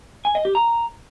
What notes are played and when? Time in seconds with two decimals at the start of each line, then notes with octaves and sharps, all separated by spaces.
0.25 G#5
0.35 D#5
0.45 G4
0.55 A#5